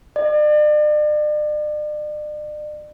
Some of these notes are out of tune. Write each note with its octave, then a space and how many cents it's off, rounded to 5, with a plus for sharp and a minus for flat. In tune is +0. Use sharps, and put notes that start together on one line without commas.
D5 +40